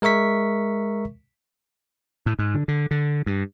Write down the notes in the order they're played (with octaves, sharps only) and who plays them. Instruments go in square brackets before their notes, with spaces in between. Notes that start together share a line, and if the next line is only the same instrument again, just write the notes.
[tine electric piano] G#3 A#4 E5 C#6 B6
[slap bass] A2
G#2
D3
D3
D3
G2